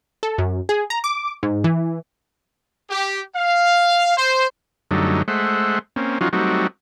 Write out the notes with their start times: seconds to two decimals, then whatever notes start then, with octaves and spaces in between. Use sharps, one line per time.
0.23 A4
0.38 F#2
0.69 G#4
0.90 A#5
1.04 D6
1.43 G#2
1.64 E3
2.89 G4
3.35 F5
4.17 C5
4.91 F#2 D3 F#3 G3 A3 D#4
5.28 G#3 A3 C5 E5 F#5
5.96 A#3 C4 C#4
6.21 F3 F#3 C#4 D#4 F4 F#4
6.33 F#3 G3 A3 C4 D#4 F#4